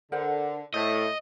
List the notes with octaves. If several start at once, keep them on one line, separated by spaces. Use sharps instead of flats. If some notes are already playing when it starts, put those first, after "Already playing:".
D3 A#4 C5 F#5
A2 A3 C5 D#5